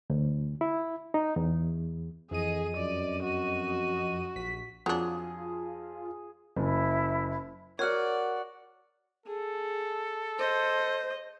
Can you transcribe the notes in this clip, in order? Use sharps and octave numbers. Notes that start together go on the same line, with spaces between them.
D2
E4
D#4
E2
F2 E3 G#4 D#5 D#7
F#2 D5
F#4
A#1 B6
F2 F#3 D4 F4 G#4
F#1 E4
F#4 A#4 C#5 D5 F#5 F6
G#4 A4
C5 D#5